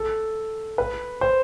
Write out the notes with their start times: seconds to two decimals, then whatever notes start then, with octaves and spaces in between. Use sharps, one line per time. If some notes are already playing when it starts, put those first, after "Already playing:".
Already playing: A4
0.78 B4
1.21 C5